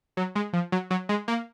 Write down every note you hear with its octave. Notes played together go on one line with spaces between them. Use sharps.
F#3
G#3
F3
F#3
F#3
G#3
A#3